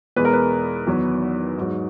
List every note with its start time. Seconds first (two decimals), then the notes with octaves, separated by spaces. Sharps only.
0.16 E2 B2 G#3 B4
0.25 A#4
0.33 B4
0.87 E2 D#3 F#3
1.57 G#2 F#3